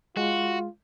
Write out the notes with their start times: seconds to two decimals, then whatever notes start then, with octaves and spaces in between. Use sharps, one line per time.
0.17 G#3 F4 F#4